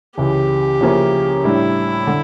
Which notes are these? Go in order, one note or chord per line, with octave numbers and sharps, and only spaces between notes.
C#2 C#3 E3 G4
C#3 F3 A#3 C#4 E4
A2 G3 D4 E4
D3